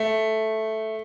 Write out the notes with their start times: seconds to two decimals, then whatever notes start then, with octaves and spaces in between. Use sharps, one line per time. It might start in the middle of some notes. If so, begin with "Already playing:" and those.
Already playing: A3